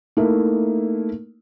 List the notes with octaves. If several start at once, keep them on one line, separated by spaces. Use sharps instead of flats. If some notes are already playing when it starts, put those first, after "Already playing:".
A3 A#3 D#4 E4